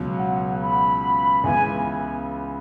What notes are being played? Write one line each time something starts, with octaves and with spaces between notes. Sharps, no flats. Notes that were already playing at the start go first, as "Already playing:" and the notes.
Already playing: C#2 B2 F#3
F#5
B5
C#2 C#3 E3 B3 G#5